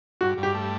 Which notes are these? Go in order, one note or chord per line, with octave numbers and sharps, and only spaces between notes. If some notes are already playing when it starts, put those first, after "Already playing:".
G2 F#4
G2
G4
A3